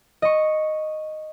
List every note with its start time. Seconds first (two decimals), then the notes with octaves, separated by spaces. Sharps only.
0.22 D#5 C#6